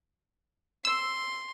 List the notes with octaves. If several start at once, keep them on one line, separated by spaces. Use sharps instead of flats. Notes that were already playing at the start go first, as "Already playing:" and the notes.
C6 E6